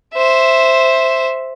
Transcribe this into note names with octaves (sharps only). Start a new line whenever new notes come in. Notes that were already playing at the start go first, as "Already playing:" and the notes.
C5 E5